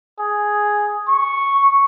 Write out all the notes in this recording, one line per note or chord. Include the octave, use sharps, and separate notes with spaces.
G#4
C#6